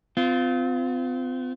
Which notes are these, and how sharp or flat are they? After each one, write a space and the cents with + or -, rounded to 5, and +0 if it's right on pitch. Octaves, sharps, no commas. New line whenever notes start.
C4 -40 F4 +0